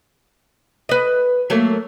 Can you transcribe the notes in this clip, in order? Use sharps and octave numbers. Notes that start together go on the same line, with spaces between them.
B4 D#5
F#3 A3 A#3